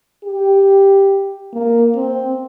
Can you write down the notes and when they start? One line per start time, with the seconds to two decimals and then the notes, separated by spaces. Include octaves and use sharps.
0.24 G4
1.53 A#3
1.95 C4